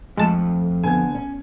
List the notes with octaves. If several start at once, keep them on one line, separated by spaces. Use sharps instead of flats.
F2 G#3 A3 A5 E7
D3 B3 G#5 G#6
C#4